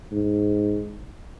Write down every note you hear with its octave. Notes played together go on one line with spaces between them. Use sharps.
G#2